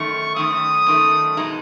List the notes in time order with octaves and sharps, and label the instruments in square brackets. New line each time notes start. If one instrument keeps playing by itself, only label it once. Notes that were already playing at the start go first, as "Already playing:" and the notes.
Already playing: [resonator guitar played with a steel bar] F#2 D#3 A3 [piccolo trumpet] C#6
[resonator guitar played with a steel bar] F#2 D#3 A3 [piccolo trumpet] D#6
[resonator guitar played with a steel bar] F#2 D#3 A3
B2 G#3 D#4